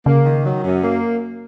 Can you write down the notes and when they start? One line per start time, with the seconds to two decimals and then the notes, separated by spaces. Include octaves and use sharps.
0.05 C#3 A#3
0.25 D#3
0.45 F#3
0.63 F#2
0.82 A#3